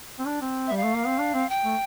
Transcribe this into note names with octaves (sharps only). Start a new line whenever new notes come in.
C4
D4
C4
G3 E5
F5
A3
A#3
C4
D4
C4
G5
A3